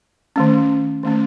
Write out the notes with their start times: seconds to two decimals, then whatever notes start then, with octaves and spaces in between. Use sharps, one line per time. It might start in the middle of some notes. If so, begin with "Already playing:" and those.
0.36 D#3 A3 C#4
1.03 D#3 A3 C#4